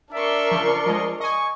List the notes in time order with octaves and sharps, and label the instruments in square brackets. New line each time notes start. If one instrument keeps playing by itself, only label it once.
[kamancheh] D4 A#4 [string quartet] D5 C6 C#6 [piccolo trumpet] E5
[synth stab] C#3 F3
[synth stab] F3 G#3 [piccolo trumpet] D#5
[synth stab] D#5 G#5 [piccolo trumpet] C#6